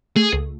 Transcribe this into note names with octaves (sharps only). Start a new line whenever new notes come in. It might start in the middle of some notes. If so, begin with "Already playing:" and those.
A3 G#4
C#2